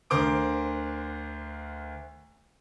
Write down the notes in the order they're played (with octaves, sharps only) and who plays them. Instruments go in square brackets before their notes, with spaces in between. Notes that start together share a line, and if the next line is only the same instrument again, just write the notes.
[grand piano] D2 D3 A#4 C5 D6 D7